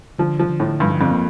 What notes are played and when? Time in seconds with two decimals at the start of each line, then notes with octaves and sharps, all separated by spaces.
0.18 D3 F3
0.40 F3
0.49 D3
0.60 A2
0.80 G2 F3
1.01 F2
1.11 A#3